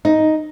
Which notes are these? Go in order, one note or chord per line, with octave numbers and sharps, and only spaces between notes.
D#4